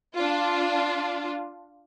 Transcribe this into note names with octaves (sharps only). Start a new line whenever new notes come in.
D4 F4